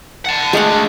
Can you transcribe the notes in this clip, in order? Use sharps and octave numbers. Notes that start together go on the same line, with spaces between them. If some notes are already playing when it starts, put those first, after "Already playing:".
F#5 A5
G#3 A3 D4 F5 F#5